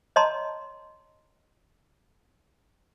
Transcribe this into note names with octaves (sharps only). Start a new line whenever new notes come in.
C#5 D#5 A5 A#5 C6